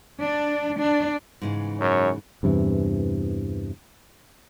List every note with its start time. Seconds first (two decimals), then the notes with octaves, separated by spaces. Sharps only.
0.21 D4
0.79 D4
1.42 G#2 C#3 E3
1.80 F#2 C#5
2.43 E2 G2 C3 E3